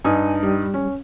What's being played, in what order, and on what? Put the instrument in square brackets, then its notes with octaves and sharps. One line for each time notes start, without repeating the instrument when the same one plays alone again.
[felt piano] G2 D#4 D#6 [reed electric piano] G#5
[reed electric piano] G3
[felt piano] C#4